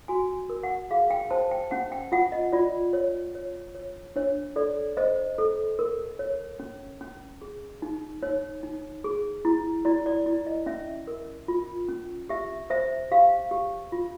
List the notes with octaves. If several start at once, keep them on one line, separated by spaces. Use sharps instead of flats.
F#4 G#5
A#4
F#5
G#4 F5
G5
C5 A5
G5
C#4 F#5
G5
F4 F#5
D#5
F4 D5
C#5
C#5
C#5
D4 C#5
A4 D5
C5 D#5
A4
A#4
C#5
C#4
C#4
G#4
D#4
D#4 C#5
D#4
G#4
E4
E4 D5
D5
E4
D#5
C#4 E5
A#4
F4
C#4
G4 E5
C5 E5
G4 F5
G4
F4